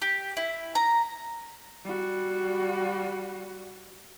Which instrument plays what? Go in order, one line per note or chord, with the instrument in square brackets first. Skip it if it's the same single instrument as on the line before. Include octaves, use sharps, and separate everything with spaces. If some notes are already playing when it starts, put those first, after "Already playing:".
[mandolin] G4
E4
A#5
[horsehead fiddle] G3 F#4